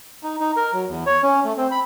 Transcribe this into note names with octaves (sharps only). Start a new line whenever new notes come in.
D#4
D#4
A#4
F#3
E2
C#5
C#4
A3
C4
B5